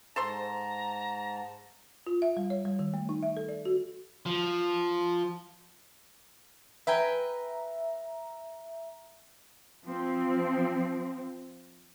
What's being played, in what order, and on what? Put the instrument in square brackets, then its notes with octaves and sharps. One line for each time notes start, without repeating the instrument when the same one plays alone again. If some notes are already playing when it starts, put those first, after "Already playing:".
[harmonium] G#2 A5 [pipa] A4 C5 C6 [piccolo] A#5
[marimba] F4
E5
G3
C#5
G3
D#3
A3
D#4
E5
A4
D5
F#4
[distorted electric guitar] F3
[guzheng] B4 G5 G#5 [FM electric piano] E5 A#5
[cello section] F3 C4